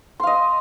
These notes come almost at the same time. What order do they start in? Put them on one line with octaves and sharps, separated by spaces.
C6 F5 D#5